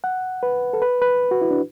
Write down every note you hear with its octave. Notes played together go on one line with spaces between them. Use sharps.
F#5
B4
A4
B4
B4
F#4
E4
D4